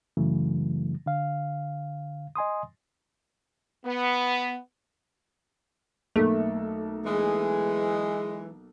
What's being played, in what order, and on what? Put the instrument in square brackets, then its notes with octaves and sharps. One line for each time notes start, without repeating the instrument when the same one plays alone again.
[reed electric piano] F#2 C#3 E3 F#3 A3
D3 F5
D#5 G#5 C6 D#6
[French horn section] B3
[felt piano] B1 A#3 A4 [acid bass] A3
[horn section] E3 G#3 [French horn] G#4